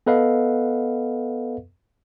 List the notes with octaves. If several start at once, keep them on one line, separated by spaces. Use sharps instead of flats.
B3 A4 B4 D#5 F5 F#5